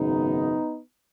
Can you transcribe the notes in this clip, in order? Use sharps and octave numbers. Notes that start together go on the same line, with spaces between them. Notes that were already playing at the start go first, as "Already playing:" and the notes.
Already playing: G#1 F#2 C#3 B3 D#4